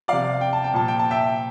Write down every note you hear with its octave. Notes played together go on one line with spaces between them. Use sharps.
C3 F3 D5 F5
G5
A5
G5
A#2 F3 A5
G5
A5
E5 G5